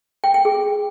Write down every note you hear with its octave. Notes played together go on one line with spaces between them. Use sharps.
G5
G5
G#4